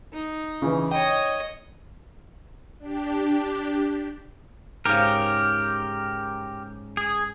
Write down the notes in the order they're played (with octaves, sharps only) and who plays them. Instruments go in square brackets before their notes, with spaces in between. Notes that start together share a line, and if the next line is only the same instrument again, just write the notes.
[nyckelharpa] D#4
[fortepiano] C#3 E3
[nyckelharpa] C#5 D#5 [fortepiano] G5
[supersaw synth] D4 G4
[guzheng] G#2 C#3 [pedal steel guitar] G4 A#4
[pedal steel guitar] G#4